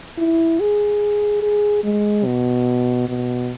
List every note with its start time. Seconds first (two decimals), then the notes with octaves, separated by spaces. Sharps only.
0.18 E4
0.60 G#4
1.42 G#4
1.84 G#3
2.25 B2
3.09 B2